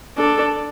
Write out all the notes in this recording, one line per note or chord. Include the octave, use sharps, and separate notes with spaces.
D4 A4